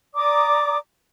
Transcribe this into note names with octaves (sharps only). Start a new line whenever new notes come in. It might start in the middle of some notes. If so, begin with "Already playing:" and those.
D5 A#5 D6 D#6